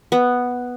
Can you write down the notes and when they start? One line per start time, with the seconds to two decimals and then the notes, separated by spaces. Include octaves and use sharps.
0.12 B3